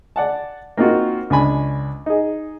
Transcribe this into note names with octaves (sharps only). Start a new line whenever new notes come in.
D5 F#5 A5
A#3 C4 D#4 F4 F#4
C#2 D4 G#5 B5
D#4 G#4